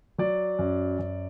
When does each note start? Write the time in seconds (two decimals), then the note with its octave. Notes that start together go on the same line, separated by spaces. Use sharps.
0.18 F#3 D5
0.59 F#2
0.99 F#2